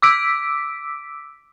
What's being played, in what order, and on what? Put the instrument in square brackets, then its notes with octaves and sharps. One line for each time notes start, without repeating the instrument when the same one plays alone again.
[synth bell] D6 E6 B6 D7